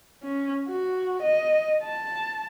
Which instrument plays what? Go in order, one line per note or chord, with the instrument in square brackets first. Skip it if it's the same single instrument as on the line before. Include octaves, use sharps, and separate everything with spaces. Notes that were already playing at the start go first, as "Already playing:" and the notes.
[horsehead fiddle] C#4
F#4
D#5
A5